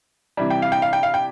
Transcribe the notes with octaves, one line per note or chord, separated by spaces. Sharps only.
C3 E3 G3
G5
F5
G5
F5
G5
F5
G5